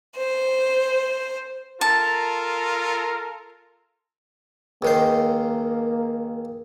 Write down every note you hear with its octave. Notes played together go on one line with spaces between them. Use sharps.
C5
F4 A4 A#4 A5
C#2 D#3 A#3 C5